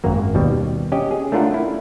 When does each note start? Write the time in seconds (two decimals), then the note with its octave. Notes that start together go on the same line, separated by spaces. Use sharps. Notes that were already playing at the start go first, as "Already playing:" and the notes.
0.04 G#1 F#2 A#3
0.35 D#2 B2 G3
0.92 C#4 G4 D#5
1.11 G#4
1.32 A3 C#4 D4 F4 A#4 F#5
1.54 E4